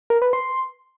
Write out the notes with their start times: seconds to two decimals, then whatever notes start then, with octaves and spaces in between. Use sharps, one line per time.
0.10 A#4
0.22 B4
0.33 C6